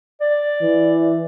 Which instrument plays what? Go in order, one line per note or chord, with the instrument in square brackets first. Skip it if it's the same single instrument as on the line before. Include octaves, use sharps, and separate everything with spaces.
[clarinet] D5
[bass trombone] E3